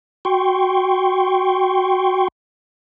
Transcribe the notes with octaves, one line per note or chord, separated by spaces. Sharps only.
F#4 G5 C6 C#6